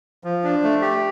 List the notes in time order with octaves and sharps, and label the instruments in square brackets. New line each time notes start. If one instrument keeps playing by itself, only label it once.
[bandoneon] F3
D4
A3
G4